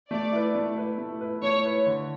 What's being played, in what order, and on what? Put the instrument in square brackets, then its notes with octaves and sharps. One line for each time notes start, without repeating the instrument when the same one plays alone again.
[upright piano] A3 [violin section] D5
[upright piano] E4 B4
A3
E4 B4
A3
E4 B4
[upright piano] A3 [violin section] C#5
[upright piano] E4 B4
D3